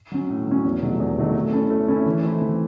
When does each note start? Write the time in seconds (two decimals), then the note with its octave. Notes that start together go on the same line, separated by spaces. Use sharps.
0.12 F#3 C#4
0.29 A2
0.47 F#3 C#4
0.65 E2
0.82 C3 D#3 F#3 A3
1.00 E2
1.17 C3 D#3 F#3 A3
1.35 A3
1.53 C#4 E4 A4
1.70 A3
1.88 C#4 E4 A4
2.06 E3
2.23 A3 C4 E4
2.42 E3